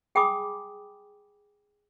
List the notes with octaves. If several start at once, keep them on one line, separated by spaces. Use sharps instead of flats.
G#4 G5 G#5 B5 D6 D#6